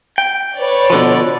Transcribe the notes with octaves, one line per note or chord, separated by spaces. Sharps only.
G5
B4 C#5 D5
B2 D3 F3